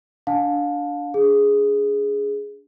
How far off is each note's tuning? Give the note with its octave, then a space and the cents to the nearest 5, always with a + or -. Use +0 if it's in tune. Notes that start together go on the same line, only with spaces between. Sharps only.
D4 -10 F5 +25 A5 +0
D4 -35 G#4 +0